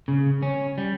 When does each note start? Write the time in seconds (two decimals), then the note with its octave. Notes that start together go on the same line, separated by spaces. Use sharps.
0.08 C#3
0.42 C#4
0.78 G3